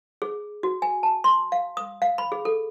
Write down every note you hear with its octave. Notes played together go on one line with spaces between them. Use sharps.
G#4
F#4
G#5
A5
C6
F5
D#6
F5
B5
G#4
A4